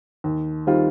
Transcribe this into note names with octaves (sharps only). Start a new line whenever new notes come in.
D#2
D#3 G3 C4 F4